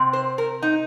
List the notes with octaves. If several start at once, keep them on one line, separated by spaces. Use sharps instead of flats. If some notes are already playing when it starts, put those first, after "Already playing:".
Already playing: C3 C4
C5
A#4
D#4